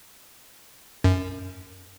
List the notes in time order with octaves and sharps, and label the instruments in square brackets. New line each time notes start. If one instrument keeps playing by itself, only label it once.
[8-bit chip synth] F#2